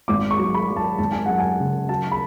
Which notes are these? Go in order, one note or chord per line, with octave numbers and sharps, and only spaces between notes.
G#1 D6
C#6
F#3
B5
F#3
A5
G#1 A5
G#5
F#2 F#5
G#5
C#3
F#3 A5
B5